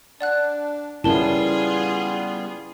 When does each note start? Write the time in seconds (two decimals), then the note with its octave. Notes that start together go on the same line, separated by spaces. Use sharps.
0.21 D4 D5 F#5 F#6
1.04 G3 B3 C#4 E4 F4 G#4 A#4 A5